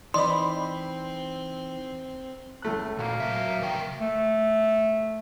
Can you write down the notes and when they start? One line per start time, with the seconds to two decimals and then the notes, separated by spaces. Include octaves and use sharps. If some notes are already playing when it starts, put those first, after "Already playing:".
0.14 E3 C4 D#4 D5 D#5 B5 C6
2.62 C#2 A3 F#6
2.99 A#2 A#3 F#4
3.20 F#3 E5
3.61 C#3 A#4 G5
4.00 A3